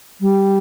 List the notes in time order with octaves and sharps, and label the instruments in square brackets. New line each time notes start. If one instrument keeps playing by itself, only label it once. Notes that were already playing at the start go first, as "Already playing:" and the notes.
[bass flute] G3